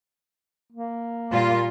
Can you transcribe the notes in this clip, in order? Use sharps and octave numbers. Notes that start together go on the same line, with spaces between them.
A#3
A#2 G3 F4